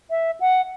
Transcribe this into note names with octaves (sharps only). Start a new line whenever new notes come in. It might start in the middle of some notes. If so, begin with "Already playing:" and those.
E5
F#5